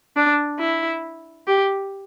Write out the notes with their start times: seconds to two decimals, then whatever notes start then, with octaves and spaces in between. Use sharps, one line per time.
0.16 D4
0.60 E4
1.47 G4